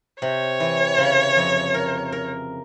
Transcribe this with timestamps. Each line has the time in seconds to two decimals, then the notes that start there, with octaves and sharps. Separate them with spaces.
0.22 C3 C#5
0.60 E3
0.98 C#3
1.36 F2
1.74 A#4
2.12 A#4